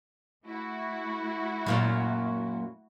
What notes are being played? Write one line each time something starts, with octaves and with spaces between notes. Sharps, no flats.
A3 E4 F#4
F#2 A#2 F#3